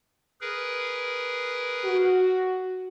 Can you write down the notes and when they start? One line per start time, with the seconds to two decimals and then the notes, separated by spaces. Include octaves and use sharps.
0.41 G#4 A#4 B4
1.84 F#4